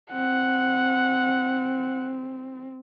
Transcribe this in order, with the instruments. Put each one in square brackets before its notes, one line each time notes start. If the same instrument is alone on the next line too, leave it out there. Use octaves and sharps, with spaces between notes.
[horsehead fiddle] C4 [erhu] F#5